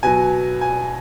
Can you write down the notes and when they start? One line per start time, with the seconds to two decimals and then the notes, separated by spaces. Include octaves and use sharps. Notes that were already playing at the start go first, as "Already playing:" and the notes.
0.03 B2 F#3 G#5
0.61 G#5